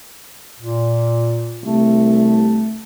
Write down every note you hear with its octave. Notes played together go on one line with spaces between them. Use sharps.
A#2
C2 A3